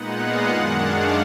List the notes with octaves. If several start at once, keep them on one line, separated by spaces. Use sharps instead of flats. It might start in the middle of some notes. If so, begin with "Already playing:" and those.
Already playing: A#2 G#3 B3 D#4 F#5
F5
F#2 D#3 G#3 D4 F#5
F5